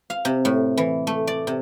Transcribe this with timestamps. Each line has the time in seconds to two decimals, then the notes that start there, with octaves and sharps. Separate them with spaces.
0.10 F5
0.25 C3
0.45 A2
0.77 E3
1.07 A3
1.27 D5
1.47 C3